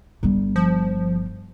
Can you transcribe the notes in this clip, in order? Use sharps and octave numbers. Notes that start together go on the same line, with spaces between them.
G1 G3
F3